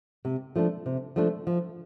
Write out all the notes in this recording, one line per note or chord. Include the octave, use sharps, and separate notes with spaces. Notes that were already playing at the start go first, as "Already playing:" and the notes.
C3
F3 A3 D4
C3
F3 A3 D4
F3